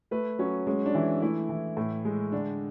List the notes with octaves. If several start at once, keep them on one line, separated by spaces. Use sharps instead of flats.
A3 B4
F#3 C#4
G#3 C#4
D4
E3 E4
A3 E4
E3
A2
G#3
D3 D4